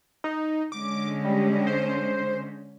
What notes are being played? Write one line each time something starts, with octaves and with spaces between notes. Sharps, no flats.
D#4
D3 G#3 C#4 D6
G3
C5